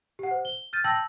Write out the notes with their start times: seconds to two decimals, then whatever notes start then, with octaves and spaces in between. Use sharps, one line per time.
0.19 G4 F#5
0.31 C5
0.45 G7
0.73 F6 G6 A6 D#7
0.84 G5 A5 E6 G6 A#6 F#7